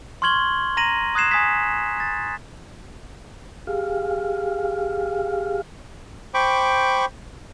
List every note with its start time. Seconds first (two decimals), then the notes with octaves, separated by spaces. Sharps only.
0.22 C6 C#6 F6 G#6 F#7 G7
0.77 A#5 A#6 D#7 F#7
1.15 D#6 F#6 G#6 C7 E7
1.31 G#5 D#6 G#6 B6
2.00 A6
3.67 G4 G#4 F5
6.34 C5 G5 B5 C#6 D6